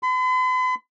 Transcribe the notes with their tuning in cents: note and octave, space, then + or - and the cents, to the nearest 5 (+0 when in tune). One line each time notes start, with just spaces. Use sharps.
B5 +45